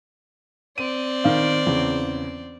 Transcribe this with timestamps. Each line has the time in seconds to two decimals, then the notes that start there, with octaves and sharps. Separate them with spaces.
0.78 C4 D5 D#7
1.24 D#3 F5
1.66 E2 C#3